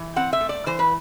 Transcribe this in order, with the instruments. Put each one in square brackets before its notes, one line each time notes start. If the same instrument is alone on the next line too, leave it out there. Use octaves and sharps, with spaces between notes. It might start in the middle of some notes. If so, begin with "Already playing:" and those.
Already playing: [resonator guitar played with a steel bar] E3
C4 F#5
E5
A3
D5
E3 C5
B4